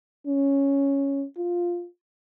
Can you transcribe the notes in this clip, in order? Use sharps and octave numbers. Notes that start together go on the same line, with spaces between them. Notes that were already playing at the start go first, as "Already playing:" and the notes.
C#4
F4